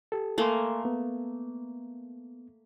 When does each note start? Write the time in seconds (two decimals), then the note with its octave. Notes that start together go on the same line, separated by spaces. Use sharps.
0.12 G4 A4
0.38 A3 A#3 A4 G#5 C6
0.85 B3